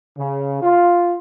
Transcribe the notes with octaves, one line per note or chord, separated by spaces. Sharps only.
C#3
F4